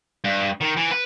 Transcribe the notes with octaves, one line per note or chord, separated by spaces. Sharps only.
G2
D#3
E3
B4